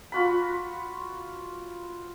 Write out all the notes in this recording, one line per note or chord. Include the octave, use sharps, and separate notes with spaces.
F4 F#4 B5